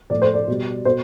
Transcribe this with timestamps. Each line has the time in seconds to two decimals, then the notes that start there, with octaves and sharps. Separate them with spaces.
0.10 A2 F3 D5
0.22 C5
0.34 D5
0.48 B2 G3
0.85 B2 C5